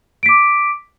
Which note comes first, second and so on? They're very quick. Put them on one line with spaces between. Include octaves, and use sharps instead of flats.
D7 B6 D6